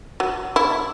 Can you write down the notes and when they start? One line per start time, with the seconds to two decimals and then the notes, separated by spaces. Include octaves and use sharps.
0.20 F#3
0.56 E4